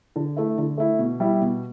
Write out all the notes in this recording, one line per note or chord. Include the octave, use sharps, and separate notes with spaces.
D3
A3 E4
D3
A3 E4
B2
G3 E4
B2